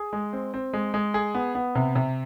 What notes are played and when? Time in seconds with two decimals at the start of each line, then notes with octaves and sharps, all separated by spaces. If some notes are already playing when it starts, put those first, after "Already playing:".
Already playing: G#4
0.13 G#3
0.33 C4
0.54 C4
0.73 G#3
0.94 G#3
1.14 G#4
1.35 B3
1.55 B3
1.75 C3
1.95 C3